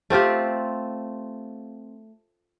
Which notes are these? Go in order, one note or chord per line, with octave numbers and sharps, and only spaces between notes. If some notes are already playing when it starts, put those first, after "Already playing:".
A3 C4 F4 G4